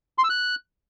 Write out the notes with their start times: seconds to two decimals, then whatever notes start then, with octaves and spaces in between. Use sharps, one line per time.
0.18 C6
0.24 E6
0.30 F#6